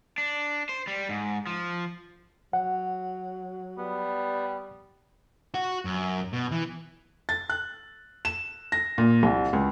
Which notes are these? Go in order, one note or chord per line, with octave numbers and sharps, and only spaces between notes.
D4
C5
G3
G#2
F3
F#3 F#5
G3 B3
F#4
F#2
B2
E3
A6
F#6
E7
A#6
A#2
C2
C#2